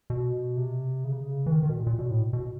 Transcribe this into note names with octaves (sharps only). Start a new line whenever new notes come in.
B2
C3
C#3
C3
C#3
E3
D#3
D#3
B2
A#2
A#2
B2
A2
B2